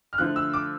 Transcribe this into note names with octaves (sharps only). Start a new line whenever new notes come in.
F6
D3 F3 A3 F#6
E6
D6